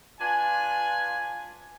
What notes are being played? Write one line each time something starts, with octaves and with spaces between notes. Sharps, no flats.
D4 F4 B4 G#5